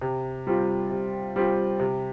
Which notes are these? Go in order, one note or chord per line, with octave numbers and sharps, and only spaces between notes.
C3
G3 C4 F4
C3
G3 C4 F4
C3